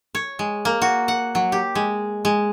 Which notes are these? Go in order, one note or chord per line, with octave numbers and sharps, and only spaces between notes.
C#5
G#3
A#3
F#4
F#5
F#3
G4
G#3
G#3